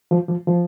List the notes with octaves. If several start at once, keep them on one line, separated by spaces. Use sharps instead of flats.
F3
F3
F3